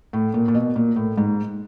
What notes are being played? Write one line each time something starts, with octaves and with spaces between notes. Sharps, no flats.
A2
A#2
A#2
B2
A#2
A2
G#2